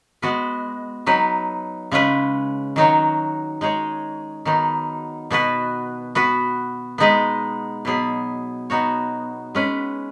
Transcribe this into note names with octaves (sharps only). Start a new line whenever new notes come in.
G#3 B3 F#4 B4
F#3 D#4 B4
C#3 G#3 C#4 B4
D#3 F#3 D#4 F#4 C#5
G#3 D#4 G#4 C#5
D#3 F#3 B3 D#4
B2 B3 F#4 B4
B3 F#4 B4
G#3 B3 D#4 B4
B2 F#3 B3 G#4
B3 D#4 F#4 C#5
G#3 C#4 B4